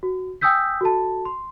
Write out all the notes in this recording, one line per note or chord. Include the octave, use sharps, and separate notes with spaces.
F#4
G5 G#5 D#6 E6 G6 B6
F#4 A4 A5
C6